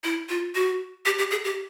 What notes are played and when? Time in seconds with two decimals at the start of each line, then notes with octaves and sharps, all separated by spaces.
0.04 E4
0.29 F4
0.55 F#4
1.05 G4
1.19 G4
1.31 G#4
1.44 G4